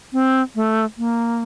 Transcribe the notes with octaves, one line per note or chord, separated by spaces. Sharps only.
C4
A3
A#3